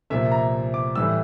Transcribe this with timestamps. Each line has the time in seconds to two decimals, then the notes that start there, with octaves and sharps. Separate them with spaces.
0.10 C2 A#2 F3 A#3 E5
0.31 A#5
0.74 D6
0.96 A2 E3 G3 E6